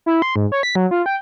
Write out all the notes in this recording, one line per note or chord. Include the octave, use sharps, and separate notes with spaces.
E4
C6
G#2
C#5
B6
F#3
F4
G5